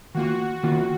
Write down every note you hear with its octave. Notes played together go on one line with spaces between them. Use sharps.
D#3 A#3 F4 F#4
D#3 A#3 F4